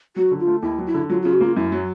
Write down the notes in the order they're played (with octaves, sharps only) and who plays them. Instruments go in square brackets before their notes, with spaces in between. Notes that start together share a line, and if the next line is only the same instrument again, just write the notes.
[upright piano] F#3 [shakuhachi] F#4
[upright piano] D3
[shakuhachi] F4
[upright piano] A3
[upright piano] D#2 [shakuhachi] E4
[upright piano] F#3
[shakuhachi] E4
[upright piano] D3
[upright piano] F#3 [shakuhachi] F4
[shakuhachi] F4
[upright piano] C#3
[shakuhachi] F#4
[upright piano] A#3 [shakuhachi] F4
[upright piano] F#2 [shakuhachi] E4
[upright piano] F#3